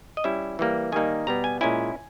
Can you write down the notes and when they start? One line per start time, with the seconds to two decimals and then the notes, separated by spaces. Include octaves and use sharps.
0.17 D#5
0.24 G3 C#4 E4 E5
0.59 E3 G3 A#3
0.92 D#3 G3 A#3 D#4 G#5
1.27 B2 G3 B3 A#5
1.44 G#5
1.61 A#2 G#3 C#4 E4 G#5